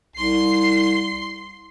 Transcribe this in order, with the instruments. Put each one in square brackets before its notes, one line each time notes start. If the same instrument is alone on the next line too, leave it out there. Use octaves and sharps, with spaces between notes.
[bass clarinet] C2 [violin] C6 C7